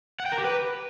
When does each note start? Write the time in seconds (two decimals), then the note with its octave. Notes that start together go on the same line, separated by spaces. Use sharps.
0.20 F#5
0.26 G5
0.32 A#4
0.38 G4
0.44 B4